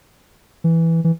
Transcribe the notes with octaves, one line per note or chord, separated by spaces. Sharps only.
E3
E3